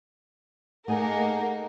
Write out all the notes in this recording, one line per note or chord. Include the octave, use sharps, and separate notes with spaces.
A3 A#3 D#4 G#4 A#4 F#5 G#5